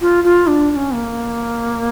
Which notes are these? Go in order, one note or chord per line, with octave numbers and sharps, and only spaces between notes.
F4
F4
D4
D4
C#4
A#3